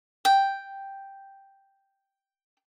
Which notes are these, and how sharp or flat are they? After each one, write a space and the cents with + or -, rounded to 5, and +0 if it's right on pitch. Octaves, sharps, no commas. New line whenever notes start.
G5 +0